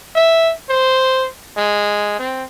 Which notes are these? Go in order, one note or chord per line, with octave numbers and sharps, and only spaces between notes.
E5
C5
G#3
C4